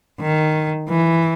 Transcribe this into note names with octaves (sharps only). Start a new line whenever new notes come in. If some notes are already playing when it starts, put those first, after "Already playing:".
D#3
E3